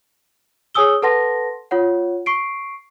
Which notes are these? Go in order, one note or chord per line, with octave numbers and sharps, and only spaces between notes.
G#4 C#5 G#5 D#6 E6 G7
A4 B4 F#5 A5 C6 A#6
F4 C#5 F#5
C#6 C7 D7